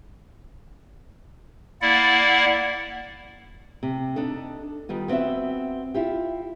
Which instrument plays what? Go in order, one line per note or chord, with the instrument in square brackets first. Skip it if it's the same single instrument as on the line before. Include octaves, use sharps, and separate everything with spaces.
[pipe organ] A#3 E4 D5 F#5
[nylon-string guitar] C3
D4 D#4 A4
D#3 G3 B3 F4
B3 C4 F4 F#4 E5
E4 F4 G4